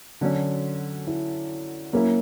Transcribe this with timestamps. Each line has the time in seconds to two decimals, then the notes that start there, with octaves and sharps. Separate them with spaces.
0.21 D3 F#3 C#4 F#4
1.07 E4
1.93 F#3 A#3 C#4 E4